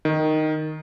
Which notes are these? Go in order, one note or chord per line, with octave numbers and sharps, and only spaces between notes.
D#3